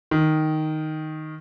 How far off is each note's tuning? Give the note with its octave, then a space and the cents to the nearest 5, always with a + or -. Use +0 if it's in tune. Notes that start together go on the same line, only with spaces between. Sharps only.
D#3 +0